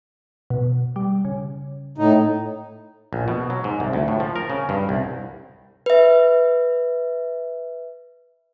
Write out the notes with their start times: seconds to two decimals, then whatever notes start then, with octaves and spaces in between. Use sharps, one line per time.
0.50 B2
0.96 G3
1.25 C#3
1.98 A2 D#4
3.13 A#1
3.28 B2
3.50 F#3
3.64 G#2
3.80 C2
3.93 D2
4.08 A2
4.20 F3
4.36 A#4
4.50 C#3
4.69 G2
4.89 C2
5.86 B4 E5